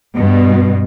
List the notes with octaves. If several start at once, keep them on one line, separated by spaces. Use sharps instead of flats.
G2 B2